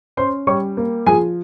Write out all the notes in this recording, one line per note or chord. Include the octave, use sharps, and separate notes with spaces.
C#4 C5 C6
G3 C#5 C#6
A#3
F3 G#4 G#5